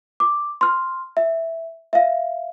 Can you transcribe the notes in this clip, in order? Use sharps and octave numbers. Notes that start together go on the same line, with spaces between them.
D6
C6 F6
E5
E5 F5